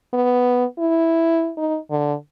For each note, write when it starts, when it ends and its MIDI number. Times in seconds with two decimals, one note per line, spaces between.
0.13 0.65 59
0.79 1.52 64
1.58 1.78 63
1.91 2.14 50